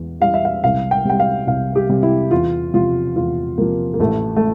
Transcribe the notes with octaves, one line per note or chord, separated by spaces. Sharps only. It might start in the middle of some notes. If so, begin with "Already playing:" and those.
Already playing: E2
E3 G3 F5
E5
F5
C2 F5
G5
C3 G3 G5
F5
C2 F5
G4
C3 G3
E4
E2 F4
C3 F3 F4
E2 F4
C3 F3 A#3
A#3
A1 A3
A3